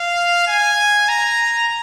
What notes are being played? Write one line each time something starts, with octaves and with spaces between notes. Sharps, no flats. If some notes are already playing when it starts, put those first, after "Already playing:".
Already playing: F5
G#5
A#5